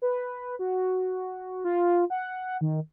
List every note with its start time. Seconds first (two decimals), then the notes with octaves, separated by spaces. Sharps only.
0.02 B4
0.59 F#4
1.64 F4
2.10 F#5
2.61 D#3